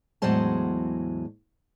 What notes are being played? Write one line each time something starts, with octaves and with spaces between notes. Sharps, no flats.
E2 A2 F#3 G#3 C5 A5